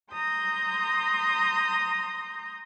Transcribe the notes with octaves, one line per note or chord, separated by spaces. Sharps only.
A#5 C6 D#6 G6